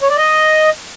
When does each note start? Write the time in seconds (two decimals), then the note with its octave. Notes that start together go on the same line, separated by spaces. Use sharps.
0.01 C#5
0.09 D5
0.17 D#5